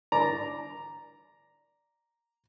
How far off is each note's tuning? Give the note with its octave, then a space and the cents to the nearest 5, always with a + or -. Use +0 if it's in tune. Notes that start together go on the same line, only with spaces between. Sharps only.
D5 +0 A#5 +0